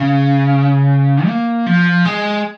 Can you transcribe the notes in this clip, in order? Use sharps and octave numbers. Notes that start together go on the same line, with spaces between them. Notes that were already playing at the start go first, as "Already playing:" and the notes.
Already playing: C#3
A#3
F3
G#3